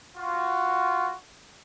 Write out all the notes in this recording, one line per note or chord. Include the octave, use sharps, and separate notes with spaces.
F4 F#4